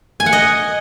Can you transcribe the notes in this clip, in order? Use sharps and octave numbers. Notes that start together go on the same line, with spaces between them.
G#5
F#5
D#5